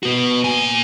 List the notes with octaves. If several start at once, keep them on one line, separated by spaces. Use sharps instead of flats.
B3 F#4
A#2 G#5